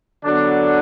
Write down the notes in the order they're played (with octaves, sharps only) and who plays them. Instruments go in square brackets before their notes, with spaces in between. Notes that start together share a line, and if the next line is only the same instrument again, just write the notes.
[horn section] D3 F#3 B3 D4